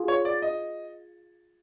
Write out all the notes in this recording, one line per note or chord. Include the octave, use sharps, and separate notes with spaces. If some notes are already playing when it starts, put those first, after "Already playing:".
Already playing: F4 G#4
C#5
D5
D#5